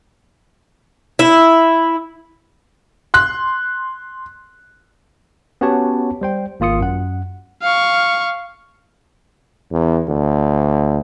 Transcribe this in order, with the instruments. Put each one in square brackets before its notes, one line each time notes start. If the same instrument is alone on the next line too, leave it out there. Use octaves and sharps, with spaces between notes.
[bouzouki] E4
[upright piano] C6 F#6
[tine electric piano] B3 C#4 F#4 G4 C#5 A5
G3 C5 G5
G#1 A#3 F4 D#6 C#7
F#2 F#5
[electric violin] F5 C#6
[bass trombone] E2
D2